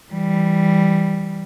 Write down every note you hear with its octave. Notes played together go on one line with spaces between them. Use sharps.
E3 G3